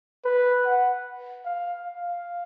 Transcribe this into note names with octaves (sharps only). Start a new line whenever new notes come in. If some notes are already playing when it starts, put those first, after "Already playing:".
B4
F#5
F5
F5